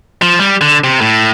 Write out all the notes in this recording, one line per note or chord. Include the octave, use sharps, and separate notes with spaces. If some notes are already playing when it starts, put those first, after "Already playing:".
F3
G3
D3
C3
A2